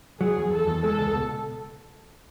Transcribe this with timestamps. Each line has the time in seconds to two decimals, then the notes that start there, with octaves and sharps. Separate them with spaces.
0.21 F#3 G#4
0.36 E2
0.52 E2 A4
0.67 E2
0.83 G#3 A4
0.99 C#2
1.15 B2